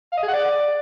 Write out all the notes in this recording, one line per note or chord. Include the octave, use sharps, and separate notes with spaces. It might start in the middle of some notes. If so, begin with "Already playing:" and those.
F5
D#5
G#4
F#5
D5